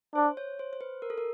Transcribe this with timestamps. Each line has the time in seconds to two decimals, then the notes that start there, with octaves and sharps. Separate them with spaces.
0.15 D4 C5
0.37 C#5
0.59 C5
0.73 C5
0.81 B4
1.02 A#4
1.10 A4
1.18 A#4